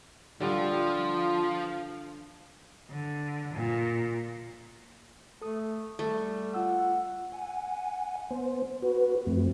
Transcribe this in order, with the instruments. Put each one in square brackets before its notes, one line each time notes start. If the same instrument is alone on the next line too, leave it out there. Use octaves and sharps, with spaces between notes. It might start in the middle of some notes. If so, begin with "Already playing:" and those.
[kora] D3 G3 [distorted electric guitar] F3 [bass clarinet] F4
[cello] D3
A#2
[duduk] A3 [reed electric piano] A4 D#6
[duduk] G3 [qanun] A3
[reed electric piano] F4 E6 [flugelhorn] F#5
[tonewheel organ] F#5 G#5
B3 C5
F#4 B4
F#2 F3 A3 C4